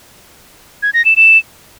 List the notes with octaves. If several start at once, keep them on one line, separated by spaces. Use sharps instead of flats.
G#6
A#6
E7
E7